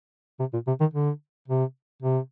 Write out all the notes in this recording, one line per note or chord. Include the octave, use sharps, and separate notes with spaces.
C3
A#2
C3
D#3
D3
C3
C3